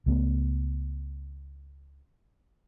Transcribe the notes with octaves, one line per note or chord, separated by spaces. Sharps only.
C#2 A3 B3